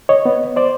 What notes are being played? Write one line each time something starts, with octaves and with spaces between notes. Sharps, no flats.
C#5 D#5
B3
C5 D5